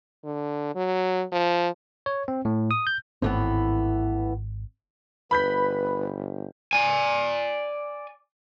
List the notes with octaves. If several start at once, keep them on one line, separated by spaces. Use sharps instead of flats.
D3
F#3
F3
C#5
C4
A2
D#6
G6
G#1 A2 E3 B3 C4
G1 B4 B5 G6 B6
D5 G#5